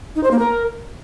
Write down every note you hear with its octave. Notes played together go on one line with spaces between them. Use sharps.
D#4
C5
A#3
A#4